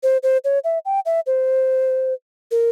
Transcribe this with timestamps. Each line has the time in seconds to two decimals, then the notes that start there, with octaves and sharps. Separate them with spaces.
0.03 C5
0.23 C5
0.45 C#5
0.64 E5
0.85 G5
1.06 E5
1.27 C5
2.51 A#4